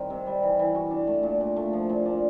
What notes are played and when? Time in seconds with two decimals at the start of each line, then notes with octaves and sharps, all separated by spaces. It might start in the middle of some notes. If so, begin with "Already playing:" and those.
Already playing: D#3 G3 C4
0.10 C3
0.27 G3
0.43 E3
0.59 E3
0.75 F#4
0.91 D4
1.07 A3
1.23 A#2
1.41 A#2
1.56 A3
1.73 F3
1.89 A#2
2.05 D4